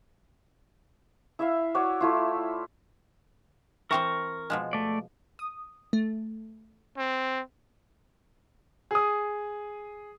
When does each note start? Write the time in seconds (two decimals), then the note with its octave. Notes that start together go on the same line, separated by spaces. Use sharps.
1.39 E4 E5 F5
1.75 F#4 C#5 D5
2.01 A3 E4 F4
3.91 E3 C4 A#4 C5 C#6
4.50 B2 F3 G#3
4.73 A3 D5
5.39 D#6
5.93 A3
6.97 C4
8.91 G#4 D#6